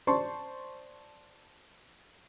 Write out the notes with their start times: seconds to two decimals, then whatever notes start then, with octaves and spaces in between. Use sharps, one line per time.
0.07 C5 D5 A5 C6 C#6